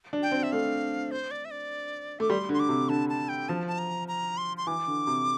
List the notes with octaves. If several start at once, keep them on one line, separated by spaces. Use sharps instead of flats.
D4
G5
C4
E5
A3 F5
C5
D5
E5
D5
A3 D6
G3 C6
D3
C6
D6
C3
D3 A5
A5
G5
F3 A5
A5
A#5
A#5
C6
C6
E3 D6
D3
C3